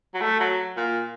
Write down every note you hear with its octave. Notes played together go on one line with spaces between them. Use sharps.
F#3
A3
F#3
A#2